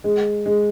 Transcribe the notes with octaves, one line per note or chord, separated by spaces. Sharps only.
G#3
G#3